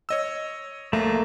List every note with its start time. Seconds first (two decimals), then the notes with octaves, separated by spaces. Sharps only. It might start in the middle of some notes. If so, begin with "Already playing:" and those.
0.09 C#5 D#5 E6
0.93 A#1 A3 A#3